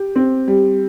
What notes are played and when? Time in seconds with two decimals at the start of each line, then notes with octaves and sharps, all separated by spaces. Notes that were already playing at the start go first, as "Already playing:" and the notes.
Already playing: G4
0.16 C4
0.48 G3